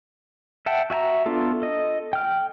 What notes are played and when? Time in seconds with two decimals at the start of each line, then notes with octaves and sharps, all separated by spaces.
0.66 E5 F#5 G5 A5
0.90 F#4 E5 G#5 A#5
1.26 B3 D4 F4 A4
1.62 A4 D#5
2.13 G5 F6